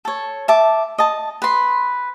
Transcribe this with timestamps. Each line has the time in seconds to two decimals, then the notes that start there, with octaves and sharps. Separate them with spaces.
0.05 A4 C#5
0.48 E5 A5 D6
0.98 D#5 A5
1.42 B4 C6